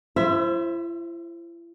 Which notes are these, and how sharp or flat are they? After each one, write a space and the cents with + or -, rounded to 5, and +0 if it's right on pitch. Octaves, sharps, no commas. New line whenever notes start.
E4 +45 C5 +15 E5 +0